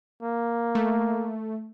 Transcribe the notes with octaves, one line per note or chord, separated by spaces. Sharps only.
A#3
A3